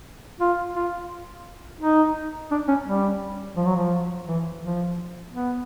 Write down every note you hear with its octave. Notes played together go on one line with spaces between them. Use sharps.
F4
F4
D#4
D4
C#4
G3
F3
F#3
F3
E3
F3
B3